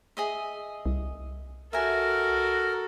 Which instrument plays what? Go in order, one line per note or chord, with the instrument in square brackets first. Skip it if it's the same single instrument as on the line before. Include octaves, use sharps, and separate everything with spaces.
[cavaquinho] G#4 D#5 E5
[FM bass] C2
[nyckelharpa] F#4 A4 [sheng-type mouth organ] A#4 [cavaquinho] E5 G#5